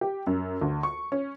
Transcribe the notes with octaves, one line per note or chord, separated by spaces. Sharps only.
G4
F#2
D2
C#6
C#4